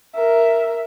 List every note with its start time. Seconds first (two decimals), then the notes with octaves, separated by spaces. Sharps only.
0.15 A#4 E5